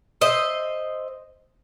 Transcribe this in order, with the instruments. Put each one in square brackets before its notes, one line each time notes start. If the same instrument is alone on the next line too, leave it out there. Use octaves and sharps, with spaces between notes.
[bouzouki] C5 D#5 E5